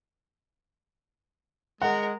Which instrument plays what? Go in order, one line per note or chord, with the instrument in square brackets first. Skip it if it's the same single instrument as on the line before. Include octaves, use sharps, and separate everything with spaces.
[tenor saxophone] G#3 [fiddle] A#4 [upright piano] F#5